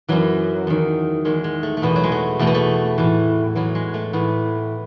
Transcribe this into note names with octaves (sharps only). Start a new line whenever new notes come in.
F#2 E3 F#3
E2 D#3
E2 D#3 G#3
G#3
A3
A3
E2 B2 B3
F#3
G#3
A3
E2 B2 A3
B3
A3
A2 E3
A2 E3 F#3
G#3
A3
A2 E3 B3